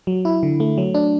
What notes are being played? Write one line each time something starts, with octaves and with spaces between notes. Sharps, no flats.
F#3
E4
D3
A3
F#3
D4